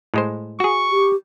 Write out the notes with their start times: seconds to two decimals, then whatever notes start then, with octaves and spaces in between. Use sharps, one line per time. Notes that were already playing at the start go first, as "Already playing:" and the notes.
0.14 A2 G#3 C5
0.60 F#4 G#4 C#6
0.91 G4